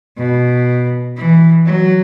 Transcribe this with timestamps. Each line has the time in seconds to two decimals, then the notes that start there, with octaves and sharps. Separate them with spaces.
0.18 B2
1.17 E3
1.66 F#3